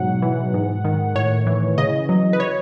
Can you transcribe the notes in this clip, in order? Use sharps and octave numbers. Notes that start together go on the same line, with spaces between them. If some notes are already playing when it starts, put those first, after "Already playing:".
Already playing: G#2 B2 F#3 F#5
E3
G#2
D#3
A2 C#5
E3
C#3 D#5
F#3
B4
C#5